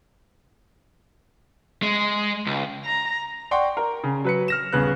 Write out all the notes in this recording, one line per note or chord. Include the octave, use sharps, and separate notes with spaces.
G#3
C#2
A#5
D5 F#5 G5 C6 C#6
A#4
C#3
F#3 B4 C#7
F6 A#6 E7
D#1 C#3 B3 F#6